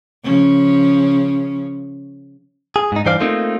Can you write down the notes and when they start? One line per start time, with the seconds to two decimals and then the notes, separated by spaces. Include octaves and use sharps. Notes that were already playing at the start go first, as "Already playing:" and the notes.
0.24 C#3 F3 C#4
2.76 G#4
2.92 G#2 D#4
3.05 G2 E3 C5 D5 F5
3.21 A3 A#3 C4 D#4 F4